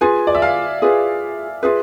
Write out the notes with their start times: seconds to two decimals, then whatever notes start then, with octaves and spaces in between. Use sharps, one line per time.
0.01 F4 G#4 B4 G#5
0.27 D5
0.35 E5
0.42 F5
0.82 F4 G#4 B4
1.63 F4 G#4 B4 E5